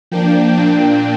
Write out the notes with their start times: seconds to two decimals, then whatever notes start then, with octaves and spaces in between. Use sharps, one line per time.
0.11 F3 A#3 D4 G5
0.54 A#2 A#3 D4